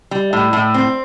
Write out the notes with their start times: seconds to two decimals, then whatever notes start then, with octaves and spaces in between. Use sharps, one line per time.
0.11 G3
0.33 A2
0.53 A2
0.74 C4